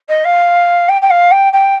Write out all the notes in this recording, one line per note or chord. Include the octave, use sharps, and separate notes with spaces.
D#5
F5
G5
G5
F5
G5
G5